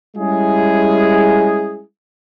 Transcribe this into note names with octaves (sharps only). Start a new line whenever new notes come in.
G3 G#3 C#4 E4 G#4